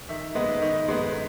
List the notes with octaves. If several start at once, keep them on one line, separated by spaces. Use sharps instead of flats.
D#3 E5
G#3 B3 D#4 D#5
D#3 D#5
G#3 B3 D#4